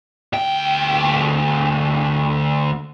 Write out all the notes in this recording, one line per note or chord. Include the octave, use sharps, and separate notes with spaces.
D2 G5